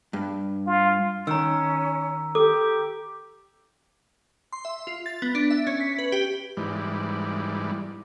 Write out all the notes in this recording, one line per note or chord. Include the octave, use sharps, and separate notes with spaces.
G2
F4
D#3 C#4 A#5 E6
G4 A4 D6
C6
E5
F4
A6
B3
D4
E5
C#4
B6
B4
G4
G#2 E3 G3